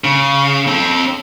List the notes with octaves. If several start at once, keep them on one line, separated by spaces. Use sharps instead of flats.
C#3
C4 A4